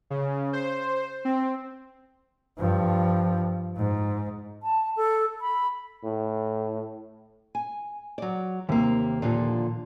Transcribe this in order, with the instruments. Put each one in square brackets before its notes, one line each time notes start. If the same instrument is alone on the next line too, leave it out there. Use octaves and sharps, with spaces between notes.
[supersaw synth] C#3
C5
C4
[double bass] G2 F3
G#2
[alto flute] A5
A4
B5
[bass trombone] A2
[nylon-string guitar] G#5
F#3 D5
[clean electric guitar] D#2 [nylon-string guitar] C3 A#3
[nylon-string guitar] A#2 D3 F3